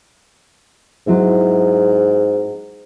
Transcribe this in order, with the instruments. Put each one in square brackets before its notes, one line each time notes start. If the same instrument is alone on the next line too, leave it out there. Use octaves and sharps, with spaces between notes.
[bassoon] G#2 [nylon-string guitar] F#3 C4 E4